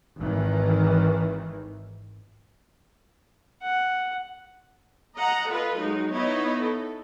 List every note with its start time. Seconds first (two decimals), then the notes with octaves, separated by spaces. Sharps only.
0.20 G#1 D#3 E3
3.63 F#5
5.15 D#5 F#5 A#5
5.48 F4 A4 B4 D#5
5.78 F#3 G#3 D#4
6.13 B3 D#4 E4 C#5 D#5
6.62 A4